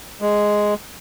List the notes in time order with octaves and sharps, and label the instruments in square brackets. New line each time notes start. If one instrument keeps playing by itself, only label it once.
[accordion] G#3